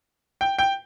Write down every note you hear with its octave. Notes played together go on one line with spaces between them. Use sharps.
G5
G5